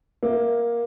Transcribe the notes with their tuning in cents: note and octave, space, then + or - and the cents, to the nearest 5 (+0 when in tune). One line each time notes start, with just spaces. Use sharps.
A#3 +15 E5 +0